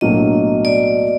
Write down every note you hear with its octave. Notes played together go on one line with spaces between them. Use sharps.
B1 A2 F#3 A#3 D4 D#5
D5